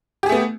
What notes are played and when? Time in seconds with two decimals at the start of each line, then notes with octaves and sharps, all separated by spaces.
0.23 G4
0.26 G#4
0.29 A3
0.32 B3